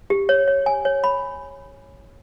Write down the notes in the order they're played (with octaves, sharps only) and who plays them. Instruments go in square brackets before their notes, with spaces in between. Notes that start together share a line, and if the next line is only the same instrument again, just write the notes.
[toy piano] G4
C#5
C#5
G#5
C#5
B5